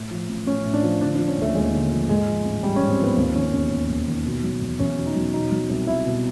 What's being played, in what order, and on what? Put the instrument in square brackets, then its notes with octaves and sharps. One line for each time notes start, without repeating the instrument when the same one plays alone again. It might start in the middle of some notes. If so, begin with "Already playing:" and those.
Already playing: [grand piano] A2
F3
A1
A1 C#4
A2
D4
F3
D3 D4
D4
F3
C#4
D#2 A3
D#2 G#3
D3
F3
G#2 G#3
F3
A1
A1 G3
C#4
G#2
C4
F3 B3
D#2 C4
D#3 C#4
E1 C#4
E1
D#2
D#3
B2
F#3
E2
E2 C#4
B2
D#4
F#3
B2 D#4
F#3
C2
C2 E4
B2